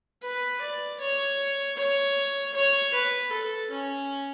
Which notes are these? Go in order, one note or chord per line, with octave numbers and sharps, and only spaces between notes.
B4
D5
C#5
C#5
C#5
B4
A4
C#4